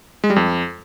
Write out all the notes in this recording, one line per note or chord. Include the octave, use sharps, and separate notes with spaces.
G#3
G3
F2